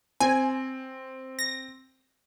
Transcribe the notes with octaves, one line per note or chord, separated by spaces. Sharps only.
C4 G#5
A#6